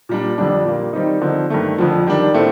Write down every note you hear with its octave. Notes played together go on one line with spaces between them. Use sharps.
A#2 G3 D4
F2 D3 G3 D4
A#2 G3 A#3
D#3 G3 C4 D#4
D3 F3 C4 D#4
G2 D#3 A3
F2 D3 F3
D#3 G3 D4
A2 A3 C4